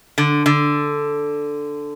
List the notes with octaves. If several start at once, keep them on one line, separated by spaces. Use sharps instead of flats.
D3
D3